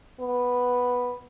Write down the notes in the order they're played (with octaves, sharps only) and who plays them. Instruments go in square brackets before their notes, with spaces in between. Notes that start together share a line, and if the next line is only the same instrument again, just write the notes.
[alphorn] B3